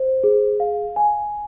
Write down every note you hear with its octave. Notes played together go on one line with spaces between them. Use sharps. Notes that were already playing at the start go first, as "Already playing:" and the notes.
Already playing: C5
G#4
F5
G#5